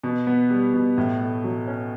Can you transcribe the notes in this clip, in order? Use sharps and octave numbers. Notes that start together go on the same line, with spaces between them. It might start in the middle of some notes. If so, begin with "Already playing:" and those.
B2
B3
G3
B2
A2
A3
F#3
C#4